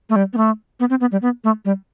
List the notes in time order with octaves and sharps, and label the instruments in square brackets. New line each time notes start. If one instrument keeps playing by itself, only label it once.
[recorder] A3
G3
B3
A3
B3
C4
B3
G3
B3
A3
G3